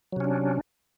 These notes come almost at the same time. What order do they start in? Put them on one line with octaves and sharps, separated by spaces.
F#3 C3 C#4 D4